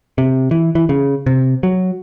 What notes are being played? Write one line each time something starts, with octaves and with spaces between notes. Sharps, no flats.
C3
E3
E3
C#3
C3
F#3